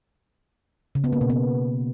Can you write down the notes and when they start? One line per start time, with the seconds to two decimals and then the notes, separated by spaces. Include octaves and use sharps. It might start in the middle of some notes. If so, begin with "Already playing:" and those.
0.95 C#3
1.04 B3
1.12 A#3
1.21 B2
1.30 B3